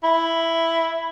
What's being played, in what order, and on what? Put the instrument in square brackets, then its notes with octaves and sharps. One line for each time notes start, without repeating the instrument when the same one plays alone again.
[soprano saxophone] E4